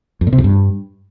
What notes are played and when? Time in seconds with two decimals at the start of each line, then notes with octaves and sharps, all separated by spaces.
0.21 F2
0.27 A#2
0.33 C3
0.38 F2
0.44 G2